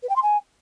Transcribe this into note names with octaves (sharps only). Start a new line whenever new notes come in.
B4
G5
C6
G#5